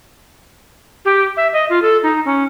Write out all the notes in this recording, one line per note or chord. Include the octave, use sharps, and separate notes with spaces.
G4
E5
D#5
F4
A4
D#4
C#4